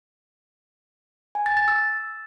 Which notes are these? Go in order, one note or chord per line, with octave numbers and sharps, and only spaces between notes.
G#5
A6
A6
E6